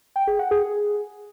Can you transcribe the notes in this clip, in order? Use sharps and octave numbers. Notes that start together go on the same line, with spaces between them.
G5
G#4
F#5
G#4